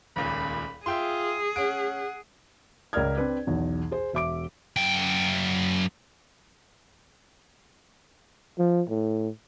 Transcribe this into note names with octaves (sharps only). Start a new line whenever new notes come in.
D#1 C#2 A#2 B5
F4 G#4 E5 G5 C6
C#4 F#5 D7
C#2 A#4 D5 F6 G#6
C4 D4 B4 D5
B1 E2 B2
G#4 C5
E1 E5 D6 D7
F#2 G5
F3
A2